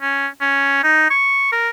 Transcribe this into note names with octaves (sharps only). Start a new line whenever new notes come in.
C#4
C#4
D#4
C#6
A#4